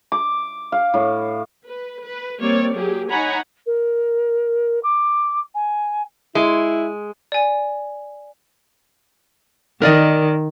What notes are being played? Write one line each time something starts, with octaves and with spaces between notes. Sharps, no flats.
D6
F5
A2
B4
B4
G3 A#3 C4 C#5 D5
F#3 A#3 G4 G#4
D#4 C#5 F#5 G#5 A#5 B5
A#4
D6
G#5
G#3 E4
D5 G#5
D#3 A#4 D5 D#5